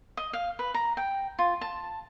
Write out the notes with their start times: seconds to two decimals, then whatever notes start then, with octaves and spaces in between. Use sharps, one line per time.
0.17 D#5
0.33 F5
0.59 B4
0.74 A#5
0.97 G5
1.39 F4
1.61 A5